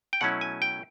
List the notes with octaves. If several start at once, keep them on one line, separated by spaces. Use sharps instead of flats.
G5
B2 F#3 A3 C#4 E4 F#5
G#5
G5